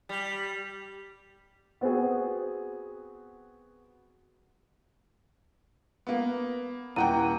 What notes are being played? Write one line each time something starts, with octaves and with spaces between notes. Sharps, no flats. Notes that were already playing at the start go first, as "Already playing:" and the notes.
G3
B3 C4 F#4 G#4
A#3 B3
D#1 E4 F#5 G5 A#5 D#7